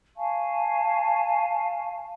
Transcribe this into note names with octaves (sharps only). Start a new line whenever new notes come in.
F5 G#5 A5 C#6